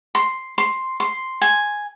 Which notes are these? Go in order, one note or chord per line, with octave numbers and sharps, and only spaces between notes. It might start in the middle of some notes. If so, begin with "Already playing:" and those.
C6
C6
C6
G#5